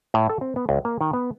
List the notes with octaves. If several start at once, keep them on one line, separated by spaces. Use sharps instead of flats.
A2
A4
C4
B3
C#2
A#3
D#3
B3